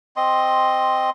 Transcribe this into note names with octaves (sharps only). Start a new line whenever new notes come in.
C4 D#5 C6